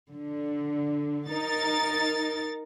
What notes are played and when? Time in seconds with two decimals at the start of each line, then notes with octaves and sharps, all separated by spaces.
0.14 D3
1.29 D#4 A#4 A6